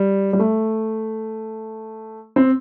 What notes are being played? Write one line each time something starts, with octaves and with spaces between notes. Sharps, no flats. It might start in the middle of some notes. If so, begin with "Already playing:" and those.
Already playing: G3
G3
A3
C4